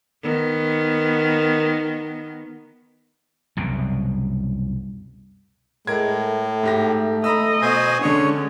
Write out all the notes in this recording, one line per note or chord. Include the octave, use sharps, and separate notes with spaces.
D#3 B3
C2 F#2 B2
A2 G#3 A#4 G#6
A3
G#2 G4 A#6
D#5 A#5 B5 E6
B2 C5 G#5
D3 G#3 C#4 D4 C#5 C#6 D#6